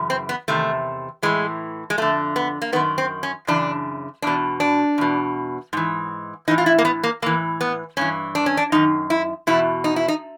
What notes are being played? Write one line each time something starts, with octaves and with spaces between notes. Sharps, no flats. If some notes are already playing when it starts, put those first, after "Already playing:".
Already playing: F#2 C#3 E3
C4
B3
E2 C3 D#3 A3
A2 E3 G#3
G#3
F2 D3 A3
B3
A#3
F#2 D#3 B3
C4
C#4
F#2 C#3 E3 D4
E2 B2 D4
D4
E2 B2
G#2 E3
A2 E3 D#4
F4
E4
A#3
B3
A#3
A2 E3 A#3
B3
G2 E3 C#4
D4
C#4
D4
F#2 D#3 D#4
E4
E2 B2 E4
D#4
E4
D#4